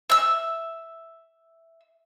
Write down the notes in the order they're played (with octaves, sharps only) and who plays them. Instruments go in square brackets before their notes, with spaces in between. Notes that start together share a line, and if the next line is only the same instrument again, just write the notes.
[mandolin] E5 E6